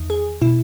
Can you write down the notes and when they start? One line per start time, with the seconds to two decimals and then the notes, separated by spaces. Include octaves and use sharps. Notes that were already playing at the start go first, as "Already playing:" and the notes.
Already playing: E2 D#3
0.10 G#4
0.41 B2 E4